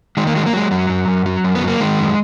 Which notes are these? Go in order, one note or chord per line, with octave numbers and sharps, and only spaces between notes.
D#3 G#3
A#3
F#3 G#3
A#3
F#3 G#3
F#2 F#3
F#2
F#2
F#3
F#2
B3
F#3
A#3
D#3 G#3
F#2